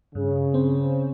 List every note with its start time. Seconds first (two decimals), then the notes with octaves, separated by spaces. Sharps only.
0.15 G2 C#3
0.54 C4 C5